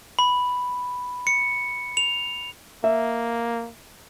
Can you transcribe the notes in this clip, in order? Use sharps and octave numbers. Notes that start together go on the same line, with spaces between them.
B5
C#7
F7
A#3 E5